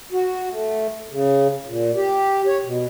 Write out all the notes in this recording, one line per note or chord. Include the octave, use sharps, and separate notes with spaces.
F#4
A3
C#3
A#2
G4
C#5
B2